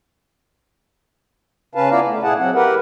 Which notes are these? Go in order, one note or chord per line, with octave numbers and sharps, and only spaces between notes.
C#3 C#4 B4 F5 A5
B3 E4 F4 D5 F5 A#5
A3
A#2 E4 G#4 F#5 A5
F#3 C4 F#5
G4 A#4 B4 F#5